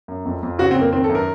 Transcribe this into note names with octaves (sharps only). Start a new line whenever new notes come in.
F#2
F2
F2
C#3 F#4
C4
F2 A#3
D#3 C4
A4
F#2
A#4